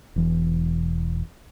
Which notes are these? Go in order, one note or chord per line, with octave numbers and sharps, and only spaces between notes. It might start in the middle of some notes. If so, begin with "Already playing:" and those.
E1 E3